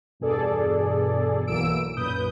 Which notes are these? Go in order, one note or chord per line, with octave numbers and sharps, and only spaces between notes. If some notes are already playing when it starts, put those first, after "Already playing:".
E2 G2 B2 G#4 A4 D5
B1 E3 F#3 A#3 E6 D7
B1 F#2 A#2 B4 D#6 G6